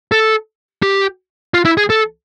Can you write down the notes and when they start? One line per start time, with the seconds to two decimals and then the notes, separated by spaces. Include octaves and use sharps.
0.12 A4
0.82 G4
1.54 F4
1.65 E4
1.78 G#4
1.90 A4